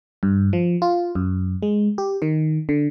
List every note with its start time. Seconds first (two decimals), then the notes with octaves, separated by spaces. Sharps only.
0.23 G2
0.53 F3
0.82 F4
1.15 F#2
1.63 G#3
1.98 G4
2.22 D#3
2.69 D3